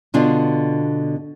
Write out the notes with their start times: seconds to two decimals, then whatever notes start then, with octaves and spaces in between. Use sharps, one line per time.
0.14 B2 D3 D4 F4